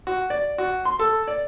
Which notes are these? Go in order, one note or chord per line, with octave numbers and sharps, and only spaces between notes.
F#4
D5
F#4
C6
A4
D5